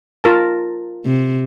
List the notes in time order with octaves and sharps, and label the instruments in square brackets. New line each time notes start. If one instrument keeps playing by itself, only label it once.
[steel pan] F4 A#4 A5
[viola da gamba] C3